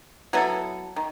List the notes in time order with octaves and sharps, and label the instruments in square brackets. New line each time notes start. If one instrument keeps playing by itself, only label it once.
[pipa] F#3 B3 E4 A4
D#3